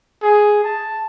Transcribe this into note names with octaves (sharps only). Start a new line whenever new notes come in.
G#4
A5